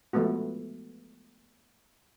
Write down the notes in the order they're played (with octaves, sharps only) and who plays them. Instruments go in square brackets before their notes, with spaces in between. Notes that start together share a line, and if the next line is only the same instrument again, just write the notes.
[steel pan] F3 G#3 A3 B3 F#4